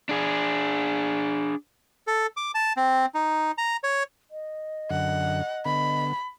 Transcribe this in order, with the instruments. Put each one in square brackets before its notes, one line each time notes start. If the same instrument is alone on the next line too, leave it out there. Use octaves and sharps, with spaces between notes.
[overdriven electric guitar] D4 G#4
[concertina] A4
D6
A5
C4
D#4
A#5
C#5
[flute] D#5
[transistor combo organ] F#2 D3 [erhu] F#5
[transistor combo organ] D3 B3 [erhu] B5